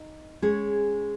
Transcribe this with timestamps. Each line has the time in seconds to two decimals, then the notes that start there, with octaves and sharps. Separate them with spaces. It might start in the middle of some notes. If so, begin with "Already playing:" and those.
Already playing: D#4
0.42 G#3 C#4 G#4 C#5